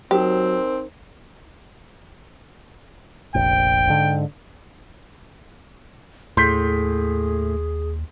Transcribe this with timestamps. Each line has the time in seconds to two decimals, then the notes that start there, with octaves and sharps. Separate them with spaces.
0.11 F#3 C4 D#4 G4 A#4 C5
3.35 F1 A#1 G5
3.88 G#2 D3
6.37 D#2 A2 G#4 C6 G6 B6